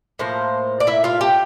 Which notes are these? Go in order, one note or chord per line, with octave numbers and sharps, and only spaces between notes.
A2 F3 A#3 C5
D5
E4 E5
F4 F5
G4 G5